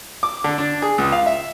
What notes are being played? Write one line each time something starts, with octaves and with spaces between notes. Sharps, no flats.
D6
D3
D4
G#4
C#2
F5
E5